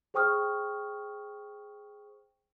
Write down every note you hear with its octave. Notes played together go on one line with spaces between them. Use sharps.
G#4 C5 G5 C#6 D#6 F6